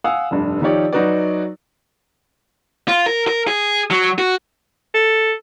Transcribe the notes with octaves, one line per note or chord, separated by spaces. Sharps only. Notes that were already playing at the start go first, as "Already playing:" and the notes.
F5 F#5 G#5 D#6 E6
F1 G2
D#3 F3 D#4 G4 C#5 D5
F#3 D#4 F#4 B4 D5
F4
A#4
A#4
G#4
F#3
F#4
A4